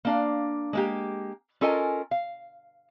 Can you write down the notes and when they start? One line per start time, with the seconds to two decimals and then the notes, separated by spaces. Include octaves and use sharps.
0.05 A#3 D4 F5
0.73 G#3 A#3 G4
1.61 C#4 F4 A4 A#4 D#5 G#5
2.11 F5